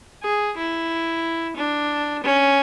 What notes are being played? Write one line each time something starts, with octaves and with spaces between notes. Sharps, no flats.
G#4
E4
D4
C#4